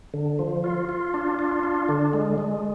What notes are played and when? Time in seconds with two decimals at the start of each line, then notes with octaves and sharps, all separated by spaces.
0.14 D3
0.39 F3
0.64 F4
0.89 F4
1.14 D4
1.39 F4
1.63 D4
1.89 D3
2.13 G#3
2.38 G#3